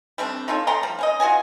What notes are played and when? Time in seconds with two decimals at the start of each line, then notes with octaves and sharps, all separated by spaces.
0.18 G3 A3 C4 D4
0.48 D#4 F4 A4 C#5
0.67 A3 G5 A#5 C6
0.83 F3 G3
0.99 C#4 C5 D#5
1.20 F4 F#4 D#5 G#5